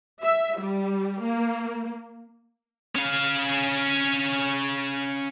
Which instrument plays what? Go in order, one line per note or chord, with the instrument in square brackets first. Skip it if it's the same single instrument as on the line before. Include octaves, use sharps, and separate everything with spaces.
[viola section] E5
G3
A#3
[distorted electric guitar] C#4 F5